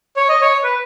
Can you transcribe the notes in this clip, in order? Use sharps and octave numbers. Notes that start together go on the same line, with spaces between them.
C#5
D#5
C#5
B4